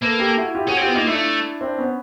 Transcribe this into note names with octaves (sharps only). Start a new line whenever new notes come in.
A#3 A4 B4
G4 A4
E4 F#4
F4 G4
C#4 F#4 G#4
C4 F4 G4
B3
A#3 D#4 F4
A3 D4 E4
C4 D4
B3 C#4